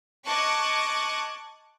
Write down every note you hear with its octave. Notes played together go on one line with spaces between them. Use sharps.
D#5 A5 C#6 D6 F#6 G#6